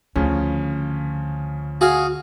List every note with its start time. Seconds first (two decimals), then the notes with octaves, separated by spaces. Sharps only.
0.16 D2 C#3 F3 C#4
1.81 F#4 G#4 F5